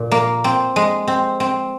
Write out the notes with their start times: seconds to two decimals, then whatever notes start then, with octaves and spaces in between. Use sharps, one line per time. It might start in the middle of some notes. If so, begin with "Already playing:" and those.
Already playing: A#2
0.11 A#3
0.44 C4
0.76 G#3
1.08 C4
1.40 C4